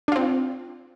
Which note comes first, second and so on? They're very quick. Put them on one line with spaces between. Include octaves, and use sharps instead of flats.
D4 F4 C4